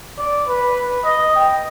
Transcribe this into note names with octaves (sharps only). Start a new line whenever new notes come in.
D5
B4
D#5
G5